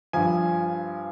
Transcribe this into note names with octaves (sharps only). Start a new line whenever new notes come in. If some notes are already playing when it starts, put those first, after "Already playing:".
G2 F3 G#5